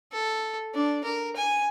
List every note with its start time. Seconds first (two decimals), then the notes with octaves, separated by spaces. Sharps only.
0.13 A4
0.74 D4
1.04 A#4
1.36 G#5